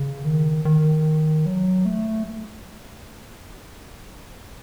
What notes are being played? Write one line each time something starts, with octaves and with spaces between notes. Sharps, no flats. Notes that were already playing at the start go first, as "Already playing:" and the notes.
Already playing: C#3
D#3
D#3
F#3
A3